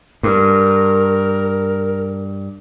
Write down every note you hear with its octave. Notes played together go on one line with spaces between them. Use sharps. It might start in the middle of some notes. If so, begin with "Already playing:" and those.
G2 A#4